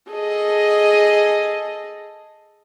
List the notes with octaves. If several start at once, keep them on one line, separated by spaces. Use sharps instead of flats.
G#4 A4 D#5